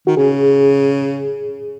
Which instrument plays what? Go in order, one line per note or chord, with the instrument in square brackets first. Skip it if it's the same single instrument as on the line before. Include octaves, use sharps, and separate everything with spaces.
[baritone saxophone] D#3 [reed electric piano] F#4
[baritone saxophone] C#3 [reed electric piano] G#4